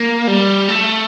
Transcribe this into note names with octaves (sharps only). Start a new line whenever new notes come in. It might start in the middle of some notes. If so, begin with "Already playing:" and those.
Already playing: A#3
G3
A3